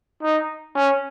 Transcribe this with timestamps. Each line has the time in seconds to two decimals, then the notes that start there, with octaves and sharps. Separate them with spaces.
0.23 D#4
0.75 C#4